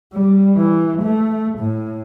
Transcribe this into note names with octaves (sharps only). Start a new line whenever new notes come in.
G3
E3
A3
A2